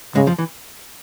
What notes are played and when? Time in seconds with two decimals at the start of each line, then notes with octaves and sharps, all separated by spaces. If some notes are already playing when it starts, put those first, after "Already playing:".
0.15 G#2 C#3 G#3
0.27 F2 F3
0.38 E3